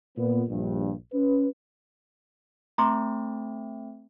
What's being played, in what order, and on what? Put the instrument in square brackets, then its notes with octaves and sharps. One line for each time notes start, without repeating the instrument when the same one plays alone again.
[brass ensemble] A#2 B3
A#1 G2
C#4 B4
[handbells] A3 C4 [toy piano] A#5 C6 D6